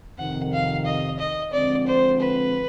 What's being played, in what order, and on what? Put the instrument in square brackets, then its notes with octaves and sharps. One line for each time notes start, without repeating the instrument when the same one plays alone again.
[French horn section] F2 C3 D#3 [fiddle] F#5
[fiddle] F5
D#5
D#5
[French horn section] D3 F3 G#3 C4 [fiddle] D5
[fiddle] C5
B4